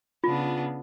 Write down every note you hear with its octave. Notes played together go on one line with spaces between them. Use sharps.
C#3 B3 D4 F4